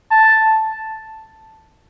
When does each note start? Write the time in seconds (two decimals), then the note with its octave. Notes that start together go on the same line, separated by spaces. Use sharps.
0.11 A5